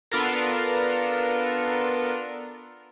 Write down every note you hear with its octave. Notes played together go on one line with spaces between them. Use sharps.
B3 D4 F4 A4 A#4